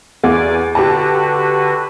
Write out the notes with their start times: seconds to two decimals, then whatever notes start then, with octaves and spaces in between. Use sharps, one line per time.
0.24 E2 D5 G#5 D6
0.75 D3 F#4 G4 B4 A5